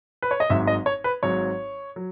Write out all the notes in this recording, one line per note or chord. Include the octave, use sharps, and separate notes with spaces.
B4
C#5
D#5
G#1 G#2 F#3 E5
D#5
C#5
B4
G#1 G#2 F#3 C#5
F#3